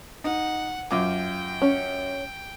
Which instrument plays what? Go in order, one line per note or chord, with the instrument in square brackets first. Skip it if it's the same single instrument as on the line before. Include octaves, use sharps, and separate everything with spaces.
[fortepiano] D#4 [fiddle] F#5
[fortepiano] F#2 F4 D6 [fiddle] G5
[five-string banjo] C#4